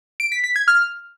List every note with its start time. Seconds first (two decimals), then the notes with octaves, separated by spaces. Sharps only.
0.20 D7
0.32 B6
0.44 B6
0.56 G#6
0.68 F6